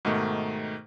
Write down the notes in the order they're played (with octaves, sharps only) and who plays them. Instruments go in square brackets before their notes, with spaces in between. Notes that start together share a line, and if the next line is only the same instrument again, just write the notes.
[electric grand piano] G#2 B2 D#3 A3